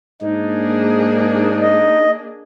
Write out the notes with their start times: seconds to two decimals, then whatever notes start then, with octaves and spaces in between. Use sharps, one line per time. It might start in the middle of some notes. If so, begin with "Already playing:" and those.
0.22 G#2 A#3 D4 D#4 G#4
1.61 D#5